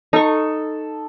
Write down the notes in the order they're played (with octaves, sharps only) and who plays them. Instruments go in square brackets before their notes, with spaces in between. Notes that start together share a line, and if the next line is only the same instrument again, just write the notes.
[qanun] D#4 C#6 [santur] A4